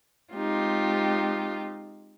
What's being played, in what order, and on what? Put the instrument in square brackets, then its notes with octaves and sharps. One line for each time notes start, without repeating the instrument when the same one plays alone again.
[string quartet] G#3 C4 D#4 F4 G4